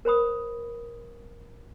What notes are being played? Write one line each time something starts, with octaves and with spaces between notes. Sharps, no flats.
A#4 C5 B5 D#6